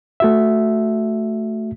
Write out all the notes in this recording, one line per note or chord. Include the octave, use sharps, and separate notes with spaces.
A3 F#4 E5